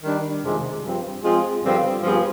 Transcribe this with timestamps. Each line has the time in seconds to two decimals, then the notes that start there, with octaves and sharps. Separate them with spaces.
0.03 D#3 G3 D4
0.43 F2 C3 D#3 G#3
0.83 G2 F3 C4
1.23 F3 G#3 C4 F4 G#4
1.63 G2 D3 F3 C4 F4
2.03 G2 F3 B3 F4 G#4